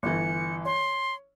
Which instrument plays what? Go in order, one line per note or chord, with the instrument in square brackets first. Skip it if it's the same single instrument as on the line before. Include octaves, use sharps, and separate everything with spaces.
[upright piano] G1 E3 [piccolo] C#7
[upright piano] C#5 [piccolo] C6